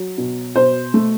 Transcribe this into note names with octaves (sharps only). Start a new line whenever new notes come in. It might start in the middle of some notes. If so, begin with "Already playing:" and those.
Already playing: F#3
B2
B2 C5
A3